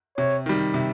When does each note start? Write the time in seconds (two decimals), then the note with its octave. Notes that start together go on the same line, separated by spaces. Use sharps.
0.17 C3 C#5
0.46 D#3 G3
0.74 C3